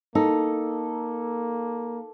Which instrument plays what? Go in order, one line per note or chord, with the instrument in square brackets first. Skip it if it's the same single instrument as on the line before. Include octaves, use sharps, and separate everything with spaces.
[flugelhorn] A#3 [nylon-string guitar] D#4 [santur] A4